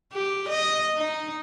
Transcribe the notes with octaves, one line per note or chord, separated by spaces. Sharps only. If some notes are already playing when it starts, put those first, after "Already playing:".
G4
D#5
D#4